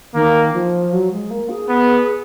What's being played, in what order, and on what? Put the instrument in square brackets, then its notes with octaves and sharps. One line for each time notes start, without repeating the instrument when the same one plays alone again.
[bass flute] D#3 [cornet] A#3
[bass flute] F3
F#3
G#3
A#3
G#4
[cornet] B3